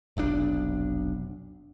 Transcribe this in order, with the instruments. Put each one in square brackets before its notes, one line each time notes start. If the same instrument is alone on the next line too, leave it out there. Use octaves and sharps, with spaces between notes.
[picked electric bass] F1 B1 G#2 D4